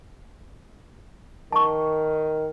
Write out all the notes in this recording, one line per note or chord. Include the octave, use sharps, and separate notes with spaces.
D#3 A5 C#6